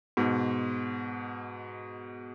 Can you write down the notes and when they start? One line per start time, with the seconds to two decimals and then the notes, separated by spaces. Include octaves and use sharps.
0.17 G#2 B2